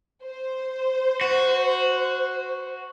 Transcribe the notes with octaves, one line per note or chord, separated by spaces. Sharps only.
C5
F#4